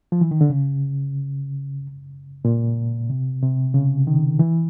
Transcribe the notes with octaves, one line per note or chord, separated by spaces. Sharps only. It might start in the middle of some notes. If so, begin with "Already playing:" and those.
F3
E3
D#3
D3
C#3
A#2
C3
C3
C#3
D#3
E3